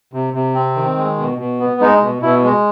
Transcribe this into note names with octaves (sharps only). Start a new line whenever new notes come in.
C3
C3
C4
D#3
G#3
B2
B2
B3
G#3 D#4
B2
B2 E4
G#3